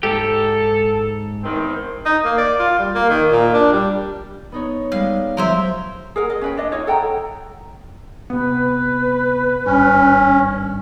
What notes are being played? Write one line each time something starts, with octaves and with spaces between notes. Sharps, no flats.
G#2 G4 A4
E2 D#3 C4
D#4
A#3
D5
F4
G3
A#3
D#3
A#2
D4
G3
B3 D#4 C#5
G3 G#3 F5
F3 F#3 A#4 C5 E5 G#6
G#4 A#4 F#5
D#5
C#4 B4 G5
D4 D#5
D#4 F4 C#5
A4 F#5 G5 A#5
C3 B3 B4
G#1 G2 C#4